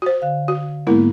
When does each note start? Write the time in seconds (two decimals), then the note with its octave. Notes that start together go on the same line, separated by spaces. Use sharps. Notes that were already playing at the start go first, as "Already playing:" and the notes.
0.02 F#4 C5
0.22 D3 F5
0.48 F#4
0.87 G#2 G#3 A#3 B3 E4 A#4